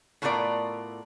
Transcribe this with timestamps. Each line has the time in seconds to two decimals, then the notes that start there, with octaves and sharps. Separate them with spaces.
0.22 A2 A3 B3 F4 A#4 D5